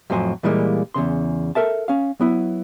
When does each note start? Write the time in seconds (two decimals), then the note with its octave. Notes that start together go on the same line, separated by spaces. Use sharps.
0.10 F2 A2 F#3 C5 G#5
0.43 A#2 E3 G3 G#3 A#3
0.94 E2 A#2 C#3 C6
1.55 A4 A#4 E5 A5
1.88 C#4 F5
2.20 F#3 B3 E4